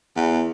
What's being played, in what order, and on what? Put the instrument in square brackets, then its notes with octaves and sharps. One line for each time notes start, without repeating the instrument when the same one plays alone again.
[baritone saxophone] E2